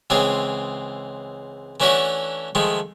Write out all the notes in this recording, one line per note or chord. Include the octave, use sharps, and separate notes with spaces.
C#2 E3 C4 F4 G#4
E3 A3 C#4 D4 E4 F#4
D#3 F3 G#3 A3